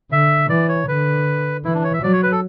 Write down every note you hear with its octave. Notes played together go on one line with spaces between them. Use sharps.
D3 E5
E3 D5
C#5
D3 B4
E3 E4
D4
C#5
E5
F#3 D5
C#5
B4
A4